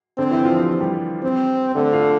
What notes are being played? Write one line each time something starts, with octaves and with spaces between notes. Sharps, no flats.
D3 C4 D4
E3 E4
F3 F4
G4
F4
G3 G4
C4
D3 A3 A4
F4 F5